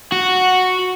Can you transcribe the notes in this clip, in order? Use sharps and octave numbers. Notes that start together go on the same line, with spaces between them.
F#4